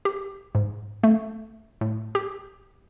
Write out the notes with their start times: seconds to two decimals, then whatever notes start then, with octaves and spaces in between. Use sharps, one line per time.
0.05 G4
0.55 G#2
1.03 A3
1.81 A2
2.15 G4